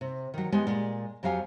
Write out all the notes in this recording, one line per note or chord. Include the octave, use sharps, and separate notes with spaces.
C3
D#3 F#3
G#3 B3 G4 D#5 G#5
A#2 G#3
F2 F#3 G4 F5 G#5